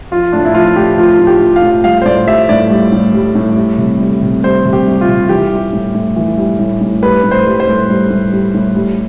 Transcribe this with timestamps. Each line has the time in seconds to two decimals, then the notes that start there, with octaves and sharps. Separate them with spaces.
0.11 F3 F4
0.32 A2 D4
0.45 E4
0.54 F3 F4
0.76 A2 G4
0.98 F3 F4
1.19 A2
1.27 G4
1.41 F3
1.56 F5
1.62 A2
1.84 G3 F5
2.02 C5
2.05 A2 D5
2.27 G3 E5
2.49 A2 D5
2.70 G3
2.92 A2
3.14 G3
3.35 A2
3.57 G3
3.78 C3
4.00 G3
4.22 C3
4.44 G3 C5
4.65 C3
4.73 G4
4.86 G3
5.01 F4
5.08 C3
5.29 E3 G4
5.51 G3
5.73 A2
5.95 A2
6.16 E3
6.37 G3
6.59 A2
6.81 A2
7.02 G3 B4
7.24 A2
7.31 C5
7.46 G3
7.60 C5
7.67 A2
7.90 G3
8.10 A2
8.33 G3
8.54 A2
8.76 G3